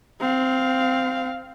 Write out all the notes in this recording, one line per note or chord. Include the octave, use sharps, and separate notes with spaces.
C4 F5